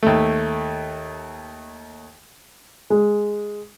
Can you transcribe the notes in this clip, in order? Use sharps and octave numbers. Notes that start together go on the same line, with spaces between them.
D#2 A3
G#3